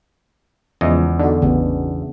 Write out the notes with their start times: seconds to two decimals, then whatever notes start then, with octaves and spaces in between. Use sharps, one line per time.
0.81 E2 C#3 F3 G#3 D#5
1.19 D3 D#4 F#4
1.42 A1 C#3 B3 D4